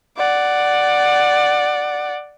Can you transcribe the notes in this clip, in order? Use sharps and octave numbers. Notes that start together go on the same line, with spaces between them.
D5 F#5